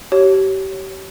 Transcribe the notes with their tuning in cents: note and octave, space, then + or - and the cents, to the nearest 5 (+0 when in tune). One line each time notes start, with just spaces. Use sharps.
G4 -35 C#5 +0